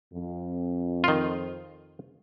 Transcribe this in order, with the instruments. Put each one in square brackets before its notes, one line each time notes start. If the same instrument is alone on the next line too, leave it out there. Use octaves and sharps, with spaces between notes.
[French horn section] F2
[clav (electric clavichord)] D#3 F4